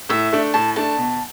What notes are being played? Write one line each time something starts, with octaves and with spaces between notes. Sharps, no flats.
A2 E5
A3 D4
A2 A5
A3 D4 A5
B2